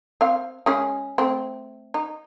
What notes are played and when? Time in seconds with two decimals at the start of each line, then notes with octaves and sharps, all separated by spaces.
0.21 C4 F5
0.66 G#3 C#4 G#4
1.18 A3 C4
1.94 D#4